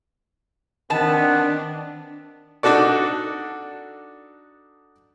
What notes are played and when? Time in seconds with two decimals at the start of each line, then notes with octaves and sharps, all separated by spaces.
0.90 D#3 B3 C4 D4 A5
2.63 D4 D#4 F#4 A4 D5